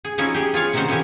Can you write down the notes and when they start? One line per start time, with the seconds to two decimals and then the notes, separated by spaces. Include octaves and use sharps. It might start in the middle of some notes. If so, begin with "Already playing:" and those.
0.05 G#4
0.18 F3 C#4 D#4 E4 G#5
0.35 G4 G#4
0.54 F4 G#4 C#5 F5
0.73 C3 D#3 C#4 D#4 C5 F#5
0.88 A2 E3 F3 C#4 G4 G#5